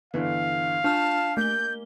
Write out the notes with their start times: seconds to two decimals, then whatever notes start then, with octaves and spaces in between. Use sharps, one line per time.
0.14 G1 D3 E3 F5
0.84 D4 F4 A5 F6
1.37 A3 A#3 G6 G7